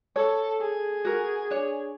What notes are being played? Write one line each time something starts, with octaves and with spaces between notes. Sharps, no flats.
A4 C#5
G#4
F#4 A#4
D4 C#5